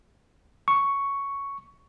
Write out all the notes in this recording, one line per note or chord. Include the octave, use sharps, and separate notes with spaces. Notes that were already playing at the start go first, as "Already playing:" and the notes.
C#6